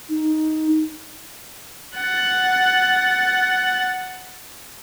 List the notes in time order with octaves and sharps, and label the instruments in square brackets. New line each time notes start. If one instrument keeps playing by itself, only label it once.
[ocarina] D#4
[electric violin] F#5 A6